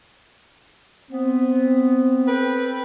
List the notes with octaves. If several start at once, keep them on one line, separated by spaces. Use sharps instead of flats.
B3 C4
A4 B4 G5